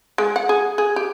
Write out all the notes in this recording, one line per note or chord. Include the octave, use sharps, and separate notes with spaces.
G#3
F#5
G#4
G#4
G4